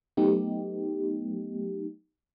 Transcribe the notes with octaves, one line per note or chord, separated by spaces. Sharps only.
F#3 A3 B3 D#4 G4